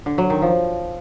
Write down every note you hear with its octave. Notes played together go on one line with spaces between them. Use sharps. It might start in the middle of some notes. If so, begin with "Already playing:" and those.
D3
F#3
D#3
F3